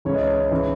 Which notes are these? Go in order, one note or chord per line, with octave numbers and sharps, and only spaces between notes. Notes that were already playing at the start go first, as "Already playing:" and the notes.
C#2 C#3 E3 C#5
D#5
C#5
C#3 E3